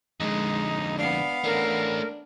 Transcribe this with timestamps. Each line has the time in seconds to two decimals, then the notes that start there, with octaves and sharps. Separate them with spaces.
0.20 F2 D3 G#3 D#4
0.98 B3 D4 F5
1.44 A3 C#4 D4 A#4